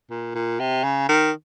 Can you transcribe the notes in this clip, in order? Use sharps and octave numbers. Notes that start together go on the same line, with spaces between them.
A#2
A#2
C3
C#3
D#3